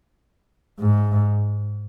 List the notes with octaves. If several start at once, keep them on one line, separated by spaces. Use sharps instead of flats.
G#2